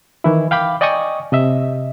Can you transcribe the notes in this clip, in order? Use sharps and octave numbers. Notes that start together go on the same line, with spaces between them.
D#3 E3 E4
F5 G5 B5 D6
D5 D#5 G5 G#5 C#6 D#6
C3 D#5 E5